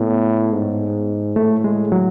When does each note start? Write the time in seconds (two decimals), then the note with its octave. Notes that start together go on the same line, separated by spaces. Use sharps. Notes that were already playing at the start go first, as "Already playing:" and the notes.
Already playing: A2 B3
0.53 G#2
1.35 A2 A3
1.64 G#3
1.92 F#3